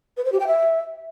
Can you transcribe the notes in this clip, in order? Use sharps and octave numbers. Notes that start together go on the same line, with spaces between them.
B4
C5
G4
G5
E5